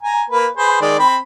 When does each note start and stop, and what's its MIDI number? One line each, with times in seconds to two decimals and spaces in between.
0.03 0.23 80
0.03 0.23 82
0.30 0.47 58
0.30 0.47 71
0.57 0.78 68
0.57 0.78 71
0.57 0.78 72
0.81 0.98 51
0.81 0.98 56
0.81 0.98 74
0.99 1.17 60
0.99 1.17 83